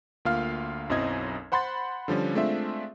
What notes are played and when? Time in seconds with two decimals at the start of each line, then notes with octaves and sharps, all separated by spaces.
0.25 D2 A#3 F4 F5 F6
0.89 B1 F#2 C4 E4 D#5 G#6
1.52 C5 F#5 B5 C6 F#6 A6
2.08 D3 F3 G3 C#4
2.35 G#3 A3 C4 D4 F4 E5